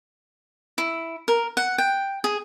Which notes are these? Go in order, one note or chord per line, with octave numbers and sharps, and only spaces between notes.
E4
A#4
F#5
G5
G#4